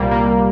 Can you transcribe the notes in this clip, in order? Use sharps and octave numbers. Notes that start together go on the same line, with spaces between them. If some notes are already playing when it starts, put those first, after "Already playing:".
Already playing: C2 A#2 G3 A#3
G3 A#3